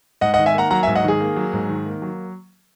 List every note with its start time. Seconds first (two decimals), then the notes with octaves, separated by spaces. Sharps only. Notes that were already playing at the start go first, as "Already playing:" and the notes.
0.21 G#2 D#5 F#5
0.34 D#5 F#5
0.38 D#3
0.46 E5 G#5
0.54 A#3 F#5 A#5
0.71 F#3 F#5 A#5
0.83 E5 G#5
0.87 G#2
0.95 D#5 F#5
1.04 D#3 G#4
1.20 A#3
1.36 F#3
1.53 G#2
1.69 D#3
1.85 A#3
2.02 F#3